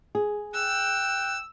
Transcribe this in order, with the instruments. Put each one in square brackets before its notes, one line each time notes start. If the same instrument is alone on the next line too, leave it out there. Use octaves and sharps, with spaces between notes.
[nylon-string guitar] G#4
[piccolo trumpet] G5 [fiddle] E6 [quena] F#6